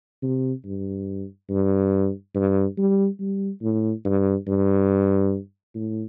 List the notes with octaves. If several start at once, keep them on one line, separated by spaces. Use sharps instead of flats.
C3
G2
G2
G2
G3
G3
A2
G2
G2
A2